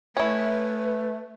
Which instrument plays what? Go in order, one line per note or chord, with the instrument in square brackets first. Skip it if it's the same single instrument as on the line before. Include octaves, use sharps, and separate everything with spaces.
[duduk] A3 [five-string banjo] C#4 E4 [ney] B4